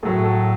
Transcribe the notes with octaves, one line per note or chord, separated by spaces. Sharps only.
A2 F#3 A3 G#4
A4